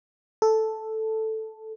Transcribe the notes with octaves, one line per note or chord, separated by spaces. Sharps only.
A4